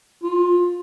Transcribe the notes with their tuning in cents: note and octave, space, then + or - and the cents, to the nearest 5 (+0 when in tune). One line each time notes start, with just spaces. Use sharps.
F4 +20